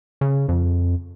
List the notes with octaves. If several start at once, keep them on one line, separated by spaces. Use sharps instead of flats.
C#3
F2